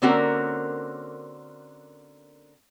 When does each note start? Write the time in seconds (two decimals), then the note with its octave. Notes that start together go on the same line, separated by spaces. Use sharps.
0.02 D3 A#3 C4 C#4 F#4 A#4